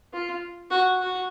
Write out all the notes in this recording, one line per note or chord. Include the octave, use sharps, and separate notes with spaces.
F4
F#4
F#4